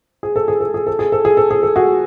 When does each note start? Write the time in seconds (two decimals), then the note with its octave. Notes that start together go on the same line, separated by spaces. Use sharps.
0.23 G#4
0.36 A4
0.48 G#4
0.61 A4
0.74 G#4
0.87 A4
0.99 G#4
1.12 A4
1.25 G#4
1.37 A4
1.51 G#4
1.63 A4
1.76 F#4 G#4